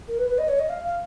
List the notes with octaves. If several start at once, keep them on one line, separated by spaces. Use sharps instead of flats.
A#4
B4
B4
D#5
C#5
D#5
F5
F5